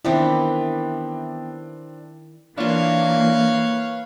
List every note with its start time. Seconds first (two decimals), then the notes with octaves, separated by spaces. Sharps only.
0.05 D#3 E3 B3 C4 D4 E4 G4
2.58 E3 A#3 D4 F4 B4 C#5 F5